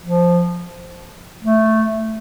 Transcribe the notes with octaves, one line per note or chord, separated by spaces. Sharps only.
F3
A3